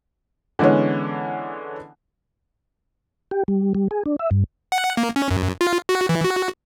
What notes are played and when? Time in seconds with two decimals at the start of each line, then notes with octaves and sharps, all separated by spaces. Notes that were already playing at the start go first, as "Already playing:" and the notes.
0.59 D3 E3 G#3 B3 C#4
3.31 G4
3.48 G3
3.75 G3
3.91 G#4
4.06 D4
4.19 E5
4.31 G2
4.72 F#5
4.97 A#3
5.16 C#4
5.31 F#2
5.61 F4
5.89 F#4
6.09 E3
6.24 F#4